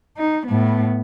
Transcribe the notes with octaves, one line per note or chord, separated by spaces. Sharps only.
D#4
A2 B3